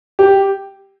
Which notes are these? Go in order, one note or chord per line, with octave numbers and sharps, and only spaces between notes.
G4